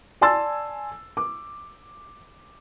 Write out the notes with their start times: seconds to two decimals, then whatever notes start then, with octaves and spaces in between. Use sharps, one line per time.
0.21 D5 G#5 A5 C6 E6 A6
1.17 D6